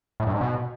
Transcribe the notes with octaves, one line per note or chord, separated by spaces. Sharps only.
A2
G2
G#2
B2